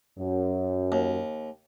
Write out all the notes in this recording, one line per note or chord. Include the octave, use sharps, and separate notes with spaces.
F#2
D#2